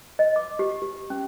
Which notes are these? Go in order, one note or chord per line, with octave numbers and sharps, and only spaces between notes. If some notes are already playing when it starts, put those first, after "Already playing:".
D#5
D6
G4
G4
C#4